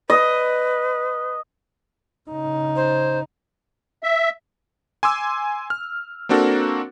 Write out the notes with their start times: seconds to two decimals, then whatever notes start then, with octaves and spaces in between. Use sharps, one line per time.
0.10 B4 D#5
2.30 C#3 D#4
2.76 C5
4.03 E5
5.03 G#5 C6 D6 E6
5.70 F6
6.29 A#3 C4 D4 F#4 A4 A#4